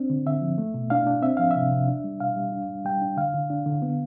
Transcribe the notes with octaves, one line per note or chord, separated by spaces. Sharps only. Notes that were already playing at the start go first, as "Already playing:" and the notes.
Already playing: C4 D4
D3
D3 E5
F3
A3
B2
D4 F5
D4
C4 E5
F3 F5
C3 E5
C3
D4
G3
B2 F5
G3
D4
G3
G3 G5
D4
D3 F5
D3
D4
D3
B3